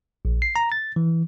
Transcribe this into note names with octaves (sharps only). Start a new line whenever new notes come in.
A#1
C7
A#5
A6
E3